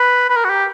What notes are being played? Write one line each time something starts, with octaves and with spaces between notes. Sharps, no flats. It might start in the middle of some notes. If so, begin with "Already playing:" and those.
Already playing: B4
B4
A#4
F#4
G4